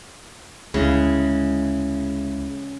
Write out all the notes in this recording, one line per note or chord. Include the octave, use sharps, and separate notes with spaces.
D2 C#3 G#3 E4